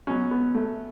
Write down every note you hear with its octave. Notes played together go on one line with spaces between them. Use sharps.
B2 F#3 C#4
B3
A3